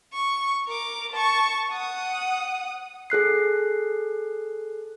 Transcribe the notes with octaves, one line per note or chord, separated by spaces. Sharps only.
C#6
A#4 D6
A5 C#6
F#5 D#6
G#4 A4 F#6 C7